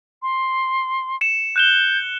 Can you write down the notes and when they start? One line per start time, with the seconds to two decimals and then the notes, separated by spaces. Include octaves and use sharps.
0.22 C6
1.21 C#7 E7
1.56 F#6 G6 E7 G7